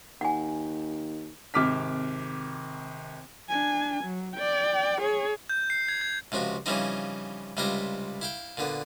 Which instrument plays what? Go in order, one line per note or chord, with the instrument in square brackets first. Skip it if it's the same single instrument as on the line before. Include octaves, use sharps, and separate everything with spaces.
[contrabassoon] D#2 [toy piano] F#5 G#5
[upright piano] G#1 C3 D6 F6 B6
[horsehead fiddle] D4 G#5
F#3
D5 G5
G#4 C#5
[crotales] G6
C7
G#6
G#6
[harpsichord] C#2 C3 F3 F#4
C#3 E3 F3 G3 C4 D#4
C#2 C3 G3 E4 F4 A#5
E4 F5 G5
A#2 D3 B3